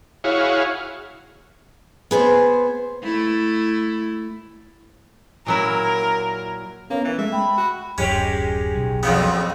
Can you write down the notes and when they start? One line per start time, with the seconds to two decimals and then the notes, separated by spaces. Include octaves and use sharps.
0.24 E4 F#4 G#4 C#5 F5
2.11 B3 G#4 C5
3.03 A3 E4
5.46 A#2 F#3 E4 A#4
6.90 A#3 B3 C#4
7.05 E3
7.18 G#3 A3 E5
7.32 G5 B5
7.58 F#4
7.98 D1 F#2 G#3 C#4 G4
8.76 B1
9.03 F2 A#2 C#3 F#3 B3 C4